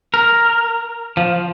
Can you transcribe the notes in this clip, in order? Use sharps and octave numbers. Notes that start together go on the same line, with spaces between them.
A#4
F3